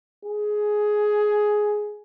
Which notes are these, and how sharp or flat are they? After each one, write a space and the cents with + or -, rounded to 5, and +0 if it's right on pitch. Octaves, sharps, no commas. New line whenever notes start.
G#4 +10